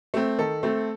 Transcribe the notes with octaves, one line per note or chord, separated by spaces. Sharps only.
A3 C4
D#3 A4
A3 C4